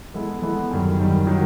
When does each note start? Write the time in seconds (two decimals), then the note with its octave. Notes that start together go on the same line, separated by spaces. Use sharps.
0.14 E3 G#3 B3 E4 A4
0.42 E3 G#3 B3 E4 A4
0.71 F#2 D#3 G3
0.99 F#2 D#3 G3
1.27 D#3 F#3